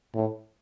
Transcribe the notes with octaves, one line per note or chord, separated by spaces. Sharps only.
A2